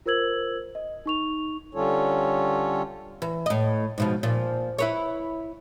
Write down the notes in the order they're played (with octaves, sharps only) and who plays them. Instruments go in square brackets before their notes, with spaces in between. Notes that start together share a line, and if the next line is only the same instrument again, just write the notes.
[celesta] F4 A#4 C5 E6 G#6 F#7
D#5
D#4 C#6 F7
[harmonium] D3 G3 C#4 F4 A4 C#5
[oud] E3
A2 D#5
G#2 B2 F3
A#2 F3
E4 B4 C#5